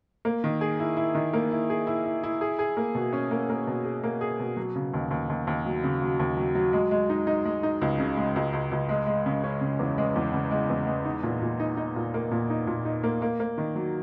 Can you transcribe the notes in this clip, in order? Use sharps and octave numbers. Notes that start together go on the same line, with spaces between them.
A#3
D#3
G#4
E4
E4
D#3
A#3
E4
G#4
E4
E4
E4
G#4
G#4
A#3
B2
C#4
A#3
A#3
B2
G#4
A#3
G#4
B2
F#3
C#3
D#2
D#2
D#2
D#2
F#3
C#3
F#3
D#2
F#3
F#3
G#3
G#3
D#4
D#4
G#3
D#4
C#2
C#3
G#3
C#2
C#2
C#2
G#3
G#3
C#3
C#4
C#3
E2
G#3
E2
C#3
G#3
E2
G#3
D#4
A#2
A#2
D#4
D#4
A#2
A#3
A#2
D#4
A#2
D#4
A#3
A#3
A#3
D#3
F#3